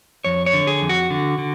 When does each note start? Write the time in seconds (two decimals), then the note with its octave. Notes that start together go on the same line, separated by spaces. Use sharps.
0.25 F2 C#5
0.46 C#5
0.53 D3
0.67 G#4
0.82 F2
0.89 F#4
1.10 D3
1.38 D3